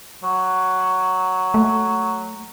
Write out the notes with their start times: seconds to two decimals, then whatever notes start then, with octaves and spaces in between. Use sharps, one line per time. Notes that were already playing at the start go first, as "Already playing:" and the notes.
0.23 F#3
1.54 A3